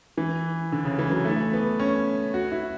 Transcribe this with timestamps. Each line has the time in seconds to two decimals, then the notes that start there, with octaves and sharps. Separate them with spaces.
0.17 E3
0.72 D3
0.85 C#3
0.99 E3
1.12 F#3
1.25 A3
1.53 B3
1.79 C#4
2.34 F#4
2.52 E4